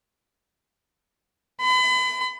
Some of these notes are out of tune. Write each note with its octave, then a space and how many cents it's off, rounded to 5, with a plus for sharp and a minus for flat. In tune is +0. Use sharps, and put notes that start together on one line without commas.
B5 +35